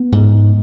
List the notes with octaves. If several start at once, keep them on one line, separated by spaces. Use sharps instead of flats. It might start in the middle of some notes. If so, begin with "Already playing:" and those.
Already playing: B3
G#2